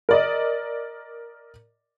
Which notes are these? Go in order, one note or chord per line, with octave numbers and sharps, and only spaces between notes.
A#4 D5 D#5